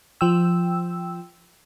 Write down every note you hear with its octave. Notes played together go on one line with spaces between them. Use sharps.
F3 G5 E6